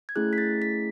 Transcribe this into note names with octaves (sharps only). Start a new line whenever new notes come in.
G#6
A3 C#4 E4 G#4 F#6
B6
A6
B6